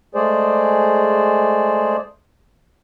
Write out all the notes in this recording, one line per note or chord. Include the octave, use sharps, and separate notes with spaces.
G#3 A3 G#4 C5 D5